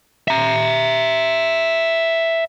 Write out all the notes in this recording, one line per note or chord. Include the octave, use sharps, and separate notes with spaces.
E5 A#5